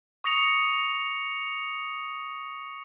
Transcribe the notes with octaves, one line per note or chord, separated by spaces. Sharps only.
C#6 D#6 A#6 C#7 F7